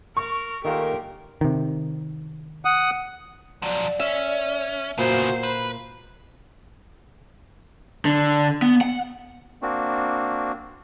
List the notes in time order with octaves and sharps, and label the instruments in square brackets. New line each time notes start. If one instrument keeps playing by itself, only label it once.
[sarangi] A#4 [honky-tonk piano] C#6
[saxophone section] A#2 A3 A#4 [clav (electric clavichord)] D#3 F5 [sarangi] G4
[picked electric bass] C3 D#3
[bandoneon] F#5 D#6
[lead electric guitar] F3 F#3 [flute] D5
[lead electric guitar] C#4 [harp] E5
[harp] A#2 [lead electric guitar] C#3 B3 [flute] F#4 [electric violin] C5
[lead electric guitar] B4 [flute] B5
[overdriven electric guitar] D3
B3
F#5
[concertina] A#3 C4 D4 F#4